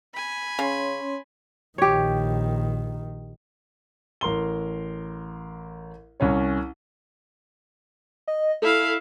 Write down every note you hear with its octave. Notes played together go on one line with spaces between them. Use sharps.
G#5 B5
C#3 C#4 C#5 C6
A#1 D#3 G4 C#5
A1 A#4 C6 G7
C2 C#4 C#5
D#5
E4 A4 F5